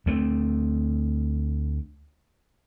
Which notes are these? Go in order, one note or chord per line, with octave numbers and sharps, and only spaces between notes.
D2 A3 C4